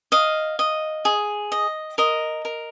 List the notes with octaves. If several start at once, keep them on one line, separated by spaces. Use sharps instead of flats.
D#5 F5
D#5
G#4
D#5
A#4 D#5
A#4